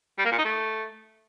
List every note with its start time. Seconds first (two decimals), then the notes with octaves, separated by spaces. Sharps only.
0.18 G3
0.25 A#3
0.32 A#2
0.38 D#4
0.45 A3